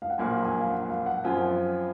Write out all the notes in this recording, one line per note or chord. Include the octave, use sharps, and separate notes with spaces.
F5
F#5
A#1 A#2 F#3 A#3 G#5
G#5
F5
F#5
F5
F#5
F#2 F3 C4 F4 G#5